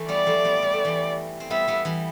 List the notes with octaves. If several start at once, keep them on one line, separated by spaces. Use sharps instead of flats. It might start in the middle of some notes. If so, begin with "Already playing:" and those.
Already playing: E3 A3
G3 B3 D5
F3 A3
G3 B3
G3
A3
E3 G3
C4
G3 B3 E5
G3 B3
E3 G3